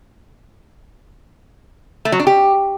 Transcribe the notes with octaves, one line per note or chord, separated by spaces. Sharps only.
A3
F#3
D4
G4